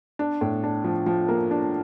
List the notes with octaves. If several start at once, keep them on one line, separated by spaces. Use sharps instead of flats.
D4
A2
D4
F3
F3
A#3
D4